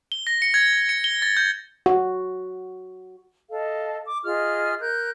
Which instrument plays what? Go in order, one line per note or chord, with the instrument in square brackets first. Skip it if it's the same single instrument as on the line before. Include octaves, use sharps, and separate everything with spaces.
[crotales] G7
A#6
C#7
G#6
A#6
C#7
G7
A6
G6
[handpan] F#4
[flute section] A4 D#5 F5
D6
F4 G#4 D#5 F6
A#4 F#6 G6